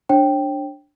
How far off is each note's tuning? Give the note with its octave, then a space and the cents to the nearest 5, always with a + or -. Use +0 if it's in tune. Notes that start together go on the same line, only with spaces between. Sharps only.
D4 +0 C#5 -40 G5 +0